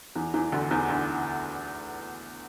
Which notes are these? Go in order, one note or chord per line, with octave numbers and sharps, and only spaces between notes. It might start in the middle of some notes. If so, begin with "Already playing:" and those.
E2 E3
E2 E3
D2 D3
E2 E3
D2 D3